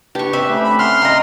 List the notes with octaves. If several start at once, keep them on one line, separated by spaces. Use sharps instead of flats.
D4 G4 B4 C#6
C4 E5 B5
A3 C#4
B5
F#5 C6 F6
D#5 F5 G5 A#5